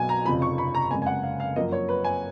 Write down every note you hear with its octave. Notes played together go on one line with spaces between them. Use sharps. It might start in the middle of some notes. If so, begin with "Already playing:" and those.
Already playing: B1 B2 F#3 G#5
A#5
F1 F2 C#3 F3 B5
C#6
B5
A#5
F#1 F2 C#3 G#3 G#5
G#5
F#5
F5
F5
F#2 F3 A#3 D#5
C#5
B4
G#5